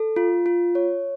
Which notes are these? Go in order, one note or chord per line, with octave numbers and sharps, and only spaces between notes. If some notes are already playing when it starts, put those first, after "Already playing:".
Already playing: A4
F4
F4
C#5